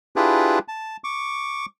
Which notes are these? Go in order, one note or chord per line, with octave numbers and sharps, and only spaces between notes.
D4 E4 F4 G4 G#4 B4
A5
C#6 D6